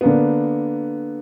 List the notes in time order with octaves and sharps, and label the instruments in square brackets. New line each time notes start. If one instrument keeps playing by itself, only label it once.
[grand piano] D3 A#3 B3